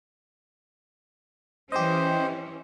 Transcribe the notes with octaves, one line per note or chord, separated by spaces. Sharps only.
E3 C#4 G4 C5 D#5